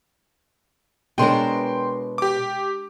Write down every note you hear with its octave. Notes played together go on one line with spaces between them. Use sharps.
B2 G#3 D4 A#4 B4 C#5 G5 C6
G4 D6